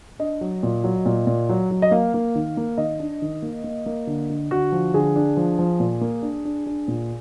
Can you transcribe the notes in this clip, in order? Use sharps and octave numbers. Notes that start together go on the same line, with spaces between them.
D4 D#5
F#3
A#2
F#3
A#2
A#2
F#3
F#3
D#5
A#3 F5
A#3
D#3
A#3
D#3 D#5
D4
D#3
A#3
A#3
A#3
D3
D3
D3 F#4
F3
D3 G#4
D4
F3
F3
A#2
A#3
D4
D4
D4
A#2